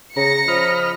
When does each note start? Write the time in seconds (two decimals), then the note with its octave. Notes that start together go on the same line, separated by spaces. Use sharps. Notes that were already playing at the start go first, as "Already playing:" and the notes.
0.16 C#3 A#5 A#6 C#7
0.48 F3 D#5 B5 F6